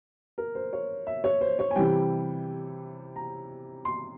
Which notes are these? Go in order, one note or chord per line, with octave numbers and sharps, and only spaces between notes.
A#4
C5
C#5
E5
C#5
C5
C#5
G#5
C3 E3 G3 G5
A#5
C6